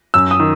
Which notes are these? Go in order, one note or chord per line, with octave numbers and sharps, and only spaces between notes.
F#2 E6
D#6
D#3